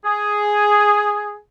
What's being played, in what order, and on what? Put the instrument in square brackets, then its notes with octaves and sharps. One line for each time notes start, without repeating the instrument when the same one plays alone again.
[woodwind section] G#4